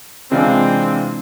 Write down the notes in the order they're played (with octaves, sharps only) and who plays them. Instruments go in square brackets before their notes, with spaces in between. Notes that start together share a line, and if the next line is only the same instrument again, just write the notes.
[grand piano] C3 E3 G#3 D4 F4 [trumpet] C4